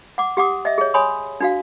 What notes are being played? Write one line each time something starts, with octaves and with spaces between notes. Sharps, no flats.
F#5 D6
G4 F#5 D6 D#6
D#5 E5
G#4 C#5
C#5 G#5 B5 C6 D#6
D4 F#4 F5